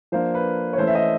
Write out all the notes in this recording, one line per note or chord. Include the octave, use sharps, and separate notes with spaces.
F3 A#3 D4 C5
B4
C#5
E3 A3 C#4 C5
E5
D#5